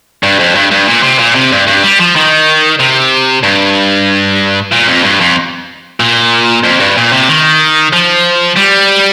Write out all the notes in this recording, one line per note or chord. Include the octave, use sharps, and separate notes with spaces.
G2
F2
G2
G2
A#2
C3
A#2
C3
G2
G2
G3
F3
D#3
C3
G2
A#2
F2
G2
F2
A#2
F2
G2
A#2
C3
D#3
F3
G3